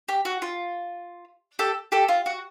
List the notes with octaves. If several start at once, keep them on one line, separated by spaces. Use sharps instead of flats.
G4
F#4
F4
G4 A4
G4 A4
F4
F#4